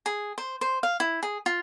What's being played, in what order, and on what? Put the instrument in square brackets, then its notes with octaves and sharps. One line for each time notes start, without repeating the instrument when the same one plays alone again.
[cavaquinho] G#4
C5
C5
F5
E4
G#4
F4